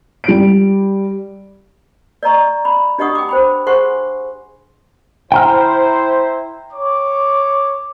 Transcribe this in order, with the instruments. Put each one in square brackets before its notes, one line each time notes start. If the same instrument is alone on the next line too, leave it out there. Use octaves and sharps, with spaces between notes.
[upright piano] G3 D7
[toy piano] D5 D#5 A#5 C#6
B5
D4 G4 D#5 F#5 C#6 D#6
G5 D6
C5 G5 B5
G#4 C5 F#5 G#5 C6 C#6
[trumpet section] E4 C5 [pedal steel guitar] G5 A#5 F6
[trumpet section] C#5 D6